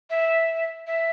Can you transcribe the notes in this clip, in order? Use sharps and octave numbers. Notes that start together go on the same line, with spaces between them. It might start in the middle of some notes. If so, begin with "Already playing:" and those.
E5
E5